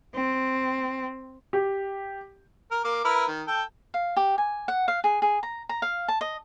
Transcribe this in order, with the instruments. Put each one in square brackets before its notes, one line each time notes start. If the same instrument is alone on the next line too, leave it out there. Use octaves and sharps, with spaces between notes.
[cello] C4
[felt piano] G4
[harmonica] A#4
A#3 D6
E4 A#4 B4
D#3
A4 G5
[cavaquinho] F5
G4
G#5
F#5
F5
G#4
G#4
A#5
A#5
F5
A5
D#5